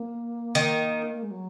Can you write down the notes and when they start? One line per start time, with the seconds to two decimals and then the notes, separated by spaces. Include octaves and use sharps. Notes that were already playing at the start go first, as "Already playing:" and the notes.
Already playing: A#3
0.55 D#3
1.14 A#3
1.22 G#3
1.31 F#3